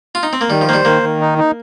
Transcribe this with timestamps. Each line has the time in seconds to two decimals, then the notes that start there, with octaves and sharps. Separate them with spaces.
0.15 F4
0.23 D#4
0.33 C4
0.41 A#3
0.50 D#3 G3
0.61 F3
0.68 A#3 C5
0.73 G3
0.85 D#3 A#3
1.03 D#3
1.21 D#4
1.38 D#4